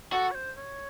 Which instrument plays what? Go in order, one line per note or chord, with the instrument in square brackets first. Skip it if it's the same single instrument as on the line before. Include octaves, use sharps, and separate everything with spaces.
[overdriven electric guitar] F#4 [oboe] A4
[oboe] C#5
C5
C#5